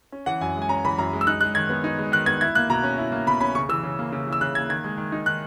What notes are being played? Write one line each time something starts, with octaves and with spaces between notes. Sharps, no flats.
C#4
E3 F#5
F#2 G#5
G#3
G#5
C#4 A#5
E3 B5
F#2 A#5
G#3
E6
D#4 F#6
G#3 F#6
D#3 G#6
B3
D#4
G#3
D#3 F#6
B3 G#6
E4 G#6
A#3 F#6
B2 A#5
C#4
E4
A#3
B2 B5
C#4 B5
C#3 C#6
E3 E6
C#3
A#3
C#3
E3
E6
C#3 F#6
A#3 G#6
D#3 G#6
G#3
D#3
D#4
D#3 F#6